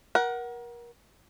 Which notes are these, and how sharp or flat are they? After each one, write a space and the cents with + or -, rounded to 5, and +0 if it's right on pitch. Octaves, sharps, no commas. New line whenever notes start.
A#4 +30 F#5 +10